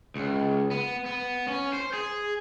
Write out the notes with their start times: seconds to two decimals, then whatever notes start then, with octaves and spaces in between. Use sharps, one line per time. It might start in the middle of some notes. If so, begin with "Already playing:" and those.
0.16 C#2
0.71 B3
1.06 B3
1.48 C#4
1.73 C5
1.93 G#4